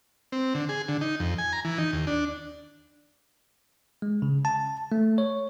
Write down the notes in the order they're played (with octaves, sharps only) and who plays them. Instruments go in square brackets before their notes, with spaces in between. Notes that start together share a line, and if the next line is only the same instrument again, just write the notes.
[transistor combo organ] C4
D3
G#4
D3
D#4
F2
G#5
A#5
E3
D#4
D#2
D4
[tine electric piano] G#3
C#3
A5
A3
C#5